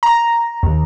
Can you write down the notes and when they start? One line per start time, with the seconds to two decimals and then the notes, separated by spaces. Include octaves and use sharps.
0.03 A#5
0.63 D#2